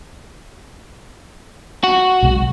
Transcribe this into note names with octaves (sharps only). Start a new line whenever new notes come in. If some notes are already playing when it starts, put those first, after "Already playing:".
F#4
B1 C3 G#3